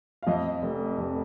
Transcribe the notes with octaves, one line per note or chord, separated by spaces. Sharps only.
F5
F2 D#5
F1
F1